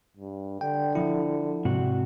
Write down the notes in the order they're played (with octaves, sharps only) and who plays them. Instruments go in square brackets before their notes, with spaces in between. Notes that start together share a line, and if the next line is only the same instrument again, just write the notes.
[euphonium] G2
[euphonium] D3 [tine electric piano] G5
[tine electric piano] F3 E4
[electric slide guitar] G#2 C3 F#4